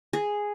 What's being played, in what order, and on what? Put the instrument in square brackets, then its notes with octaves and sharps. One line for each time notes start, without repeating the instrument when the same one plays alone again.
[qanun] G#4